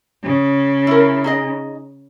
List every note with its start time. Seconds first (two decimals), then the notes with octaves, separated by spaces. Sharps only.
0.23 C#3
0.87 E4 A#4
1.24 D#4 G#4 D#5